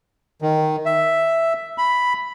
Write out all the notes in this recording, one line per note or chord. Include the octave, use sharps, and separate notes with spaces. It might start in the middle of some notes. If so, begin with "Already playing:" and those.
D#3
E5
B5